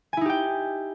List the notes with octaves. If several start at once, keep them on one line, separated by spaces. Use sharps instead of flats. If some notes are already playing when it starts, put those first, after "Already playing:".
D#4 E4 G4 G5 G#5